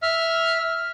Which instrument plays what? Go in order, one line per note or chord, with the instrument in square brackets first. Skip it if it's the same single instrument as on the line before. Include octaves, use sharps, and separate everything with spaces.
[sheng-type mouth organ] E5 F6